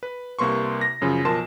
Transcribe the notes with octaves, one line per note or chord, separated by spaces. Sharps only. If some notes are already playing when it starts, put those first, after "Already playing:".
B4
C2 C3 A#3 B4 C6 C#6
A#6
F#2 C#3 F3
B1 F3 A#4 A5 C6 E7